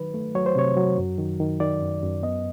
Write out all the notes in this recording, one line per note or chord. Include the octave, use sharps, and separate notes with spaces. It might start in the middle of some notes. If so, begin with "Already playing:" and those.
Already playing: D#3 F#3 B4
A3
F#3 C#5
C5
C3 C#5
F#3
F#2
D#3
D#3
D#3 D5
F#2
F#2
B3 D#5